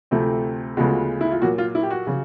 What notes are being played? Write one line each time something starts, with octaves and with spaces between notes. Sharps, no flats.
D2 C3 F3 A3 C4
D2 C#3 F3 G#3 B3 F#4
E4
F4
A#2 F#3 A#3 F#4
F4
E4
G4
F#4
C#3 F#3